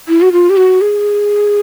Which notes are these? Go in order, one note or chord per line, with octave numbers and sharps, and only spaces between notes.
E4
F#4
F4
G4
F#4
G#4